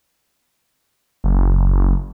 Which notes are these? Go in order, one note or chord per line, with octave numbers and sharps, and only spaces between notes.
F#1